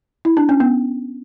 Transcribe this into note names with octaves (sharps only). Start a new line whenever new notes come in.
E4
D4
C#4
B3